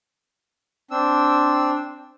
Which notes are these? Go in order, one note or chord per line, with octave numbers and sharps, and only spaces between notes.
C4 D4 E6